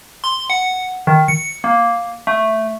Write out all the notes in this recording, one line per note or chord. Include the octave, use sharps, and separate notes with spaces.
C6
F#5
D#3
C#7
A#3
A3